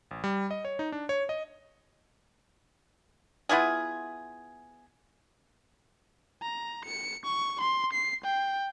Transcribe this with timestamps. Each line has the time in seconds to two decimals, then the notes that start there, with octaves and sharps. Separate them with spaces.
0.11 A1
0.24 G3
0.51 D#5
0.65 C#5
0.79 D#4
0.92 D4
1.09 C#5
1.29 D#5
3.49 B3 E4 F4 G#4
6.42 A#5
6.85 C#7
7.25 C#6
7.61 C6
7.93 C7
8.25 G5